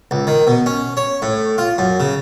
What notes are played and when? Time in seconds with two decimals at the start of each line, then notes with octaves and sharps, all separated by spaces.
0.11 C#2
0.27 D#3
0.47 B2
0.66 C#4
0.97 C#5
1.22 A2
1.58 F4
1.78 F#2
2.00 C#3